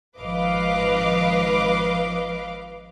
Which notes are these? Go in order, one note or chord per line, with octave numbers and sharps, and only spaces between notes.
G#1 F3 B4 D#5 F5 D6